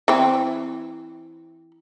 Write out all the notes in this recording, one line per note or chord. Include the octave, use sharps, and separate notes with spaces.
E3 C4